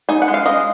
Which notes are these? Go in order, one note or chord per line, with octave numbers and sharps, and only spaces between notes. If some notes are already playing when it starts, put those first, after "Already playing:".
D#4 G#5
F#5
G#3
F5
G#3 D#5